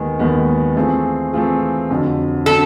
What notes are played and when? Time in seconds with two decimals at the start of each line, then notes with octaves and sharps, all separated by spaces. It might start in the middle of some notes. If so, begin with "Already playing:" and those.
Already playing: D#2 D#3 G#3 B3
0.19 D#2 D#3 G#3 B3
0.76 E3 A3 C4 F4 G#4
1.33 E3 A3 C4 F4 G#4
1.90 F2 D3 F#3
2.46 D3 F#3 A4